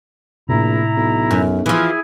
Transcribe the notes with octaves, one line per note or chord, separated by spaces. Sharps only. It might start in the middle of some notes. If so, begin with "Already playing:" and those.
A#1 A2 C3 E4 A#5
B1
F#2
E3 F3 E4 G#4 G#5